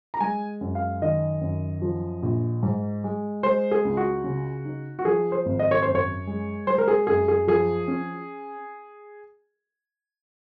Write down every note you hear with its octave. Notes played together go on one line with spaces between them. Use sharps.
A#5
G#3 G#5
F#2
F5
D#3 D#5
F#2
F3
A#1
G#2
G#3
G#3 C5
G#4
C#2
F#4
C#3
D#4
F#4
F3 G#4
C5
G#1
D#5
C#5
F#2 C5
C#5
G#3
G#3 C5
A#4
G#4
F#2 G#4
G#4
F3 G#4
C#4